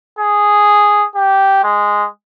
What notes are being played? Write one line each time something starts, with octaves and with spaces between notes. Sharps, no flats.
G#4
G4
G#3